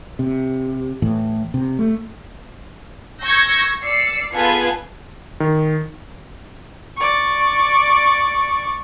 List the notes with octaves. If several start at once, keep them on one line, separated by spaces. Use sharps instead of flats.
C3
A2 E3
C3
A3
C#6 E6 G6 G#6 A#6 C#7
D5 E6 C7 C#7
B3 F4 G#4 A4 B4 G#5
D#3
D5 C#6